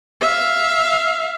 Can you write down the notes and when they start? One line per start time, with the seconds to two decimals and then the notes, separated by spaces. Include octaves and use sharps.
0.21 E5 F5